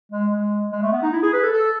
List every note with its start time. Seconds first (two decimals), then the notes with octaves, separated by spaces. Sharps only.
0.11 G#3
0.32 G#3
0.72 G#3
0.83 A3
0.93 B3
1.02 D#4
1.13 E4
1.23 G#4
1.33 B4
1.43 A4
1.53 A4